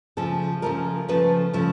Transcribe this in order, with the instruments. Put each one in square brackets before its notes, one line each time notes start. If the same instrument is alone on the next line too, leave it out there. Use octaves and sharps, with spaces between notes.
[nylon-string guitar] C#3 F3 A3 A4
C#3 F3 A3 A#4
C#3 F3 A3 B4
C#3 F3 A3